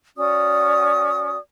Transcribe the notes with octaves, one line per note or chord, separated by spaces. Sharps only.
C#4 F#4 D5 D#6